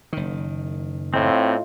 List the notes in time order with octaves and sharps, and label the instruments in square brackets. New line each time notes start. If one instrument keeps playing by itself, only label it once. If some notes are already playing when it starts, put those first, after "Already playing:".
[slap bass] F#1 D#3
[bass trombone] A2 [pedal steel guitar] C4 [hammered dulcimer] D#4 F4 F5